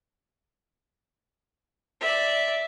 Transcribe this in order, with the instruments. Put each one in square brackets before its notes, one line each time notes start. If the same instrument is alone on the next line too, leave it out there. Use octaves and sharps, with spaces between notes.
[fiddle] D5 E5